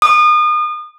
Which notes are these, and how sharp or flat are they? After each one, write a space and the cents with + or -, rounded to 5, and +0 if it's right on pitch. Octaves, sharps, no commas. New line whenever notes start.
D#6 -35